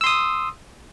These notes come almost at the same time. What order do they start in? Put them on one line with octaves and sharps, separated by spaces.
E6 C6 D#6